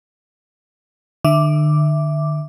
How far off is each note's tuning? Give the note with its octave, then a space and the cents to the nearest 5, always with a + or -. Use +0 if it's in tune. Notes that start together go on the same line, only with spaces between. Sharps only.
D3 +40 E5 +0 D6 +0